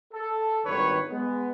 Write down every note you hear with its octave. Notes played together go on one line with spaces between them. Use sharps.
A4
G#1 G2 D#3 B4 C#5
G#3 B3